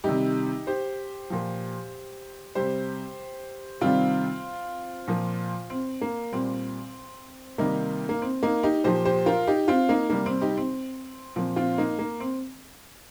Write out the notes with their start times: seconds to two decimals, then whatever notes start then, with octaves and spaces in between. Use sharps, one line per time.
0.04 C3 D#3 G3 D#4 G4
0.67 G4 C5
1.30 A#2 F3
2.55 C3 G3 G4 C5
3.81 C3 D#3 G3 C4 F4
5.08 A#2 F3
5.70 C4
6.01 A#3
6.32 A#2 G3 C4
7.58 C3 D#3 G3 A#3 D#4
8.09 A#3
8.22 C4
8.43 A#3 D#4
8.63 D#4 G4
8.84 A#2 F3 G4 C5
9.05 G4 C5
9.26 F4 A#4
9.47 D#4 G4
9.68 C4 F4
9.89 A#3 D#4
10.10 C3 G3 A#3
10.26 C4
10.41 D#4 G4
10.57 C4
11.36 A#2 F3 C4
11.56 C4 F4
11.78 A#3 D#4
11.99 A#3
12.20 C4